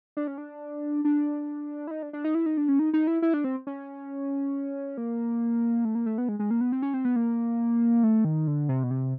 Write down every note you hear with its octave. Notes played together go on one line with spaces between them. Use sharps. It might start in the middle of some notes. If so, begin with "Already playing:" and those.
D4
C#4
D4
D4
E4
D#4
D4
D4
D#4
E4
D#4
D4
C#4
D#4
D#4
E4
E4
D4
C4
C#4
A#3
A3
A#3
A3
B3
G#3
G#3
A#3
B3
C4
C#4
C4
B3
A#3
A3
D#3
D3
C3
B2
C3